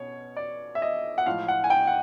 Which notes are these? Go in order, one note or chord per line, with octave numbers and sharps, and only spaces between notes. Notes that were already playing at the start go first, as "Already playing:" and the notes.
Already playing: B2 C#4 C#5
D5
E5
D#5
F#5
A2 F3 G#3 F5
F#5
G#5
G5
F#5